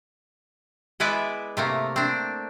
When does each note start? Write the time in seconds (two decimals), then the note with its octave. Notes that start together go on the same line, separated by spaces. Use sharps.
1.00 G#3 B3 E4 B4 D5 E5
1.57 C3 A3 A#3
1.96 C4 D4